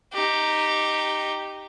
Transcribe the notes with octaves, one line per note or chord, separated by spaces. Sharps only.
D#4 G4